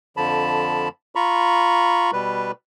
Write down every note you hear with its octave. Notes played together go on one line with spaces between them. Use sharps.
F2 D3 F3 A5 B5
F4 A#5 B5 C#6
B2 G3 B4